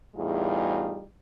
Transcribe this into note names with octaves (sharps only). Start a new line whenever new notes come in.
E2 A2 G3 D#4 F4 G#4